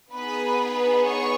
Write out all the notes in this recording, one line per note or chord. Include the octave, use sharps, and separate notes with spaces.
B3 D#4 G#4 B4 B5
C#5 C#6